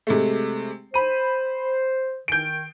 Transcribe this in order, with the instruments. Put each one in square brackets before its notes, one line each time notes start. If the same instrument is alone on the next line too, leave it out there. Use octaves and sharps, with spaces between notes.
[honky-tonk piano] C3 G#3 A3
[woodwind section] C5 [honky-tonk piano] B5 D#7
[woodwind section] D#3 [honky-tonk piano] G6 D7